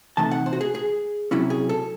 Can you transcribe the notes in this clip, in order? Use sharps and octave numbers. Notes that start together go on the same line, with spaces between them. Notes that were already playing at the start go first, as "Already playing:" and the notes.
C3 E3 A3 D#4 A5
F#5
C5
F#4
G#4
G#4
C3 F#3 C#4 E4
G#4
A4